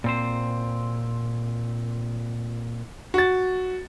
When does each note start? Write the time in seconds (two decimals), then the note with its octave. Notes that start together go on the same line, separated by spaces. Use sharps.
0.04 A#2 C4 C5
3.14 F#4 A6